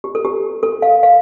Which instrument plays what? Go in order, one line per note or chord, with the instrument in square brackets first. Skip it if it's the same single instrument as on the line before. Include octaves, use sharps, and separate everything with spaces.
[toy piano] G4
A4
G4
A4
F5
F5